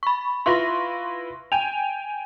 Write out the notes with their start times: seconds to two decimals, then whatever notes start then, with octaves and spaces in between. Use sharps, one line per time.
0.03 B5 C#6
0.46 E4 F4 B4 C6 C#6 A#6
1.52 G5 G#5 F7